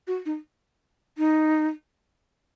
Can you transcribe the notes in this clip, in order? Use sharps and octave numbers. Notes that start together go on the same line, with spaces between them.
F#4
D#4
D#4